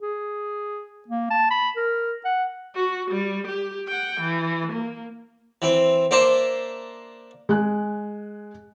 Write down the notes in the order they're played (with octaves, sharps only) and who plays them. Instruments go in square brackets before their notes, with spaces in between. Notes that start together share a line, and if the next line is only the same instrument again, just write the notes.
[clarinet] G#4
A#3
A5
B5
A#4
F#5
[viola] F#4
G3
G4
F#5 G5
E3
A#3
[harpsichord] E3 C4
A#3 D4 C5 E5 A5
[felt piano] G#3 G#5 F#6